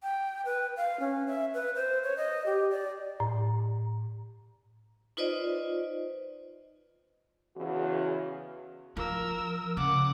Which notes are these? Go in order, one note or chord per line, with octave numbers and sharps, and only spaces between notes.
G5
B4
F5
C#4
E5
B4
C5
C#5
D#5
G4
D5
A2
D#4 F4 B4 C5 D5 D#5
E2 C#3 E3 F#4
F3 A#4 E6
C#3 F#5 D6